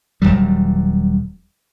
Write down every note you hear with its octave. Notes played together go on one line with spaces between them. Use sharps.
D#1 F2 F#3 G3